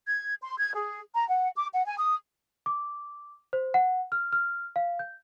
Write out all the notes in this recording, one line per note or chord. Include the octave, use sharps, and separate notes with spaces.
G#6
C6
G#6
G#4
A#5
F#5
D6
F#5
G#5
D#6
D6
C5
F#5
F6
F6
F5
G6